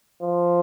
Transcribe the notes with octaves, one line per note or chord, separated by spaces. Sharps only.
F3